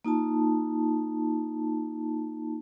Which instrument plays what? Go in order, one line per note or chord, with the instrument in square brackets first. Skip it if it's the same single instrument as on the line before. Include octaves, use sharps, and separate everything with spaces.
[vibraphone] A#3 D#4 F4 A5